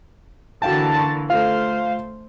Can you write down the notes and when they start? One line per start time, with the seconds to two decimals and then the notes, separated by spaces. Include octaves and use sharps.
0.62 D3 E3 A#3 F#4 F5 G5 A5
0.96 C6 C#6
1.30 A3 F4 A4 C5 F5